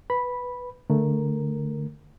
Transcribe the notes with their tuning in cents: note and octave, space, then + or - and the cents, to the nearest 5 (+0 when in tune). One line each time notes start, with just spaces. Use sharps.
B4 +0 B5 -5
D3 +0 A3 +0 A#4 +0